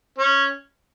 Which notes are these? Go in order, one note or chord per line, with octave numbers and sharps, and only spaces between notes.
C#4